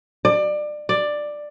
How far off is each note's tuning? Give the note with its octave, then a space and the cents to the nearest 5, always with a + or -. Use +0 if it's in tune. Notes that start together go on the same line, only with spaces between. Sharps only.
D5 +25
D5 +10